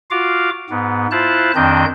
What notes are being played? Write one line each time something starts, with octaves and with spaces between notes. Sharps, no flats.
F4 F#4 F5 D6
G#2 B3
E4 F4 C5 A5 F#6
F2 D#3 C4 D4 D#5 G6